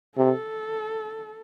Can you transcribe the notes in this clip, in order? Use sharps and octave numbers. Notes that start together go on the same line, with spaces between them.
C3 A4